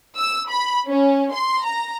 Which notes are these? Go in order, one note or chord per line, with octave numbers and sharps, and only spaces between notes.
E6
B5
C#4
C6
A#5